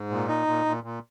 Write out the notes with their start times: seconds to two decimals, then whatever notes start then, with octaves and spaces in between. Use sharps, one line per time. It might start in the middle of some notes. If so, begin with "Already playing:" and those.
Already playing: G#2
0.10 A#2
0.28 D#4
0.47 A#2
0.66 A#2
0.83 A#2